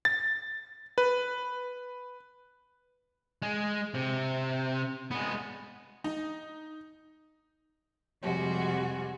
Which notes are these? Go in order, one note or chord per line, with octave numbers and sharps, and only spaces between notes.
A6
B4
G#3
C3
G#3 B3
D#4
F2 C3 G3 G#3 F#4